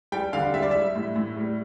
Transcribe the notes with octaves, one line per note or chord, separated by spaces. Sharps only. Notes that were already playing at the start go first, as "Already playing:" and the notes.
G3 G5
D3 F5
G3 E5
D5
G3 E5
A2
A2
G3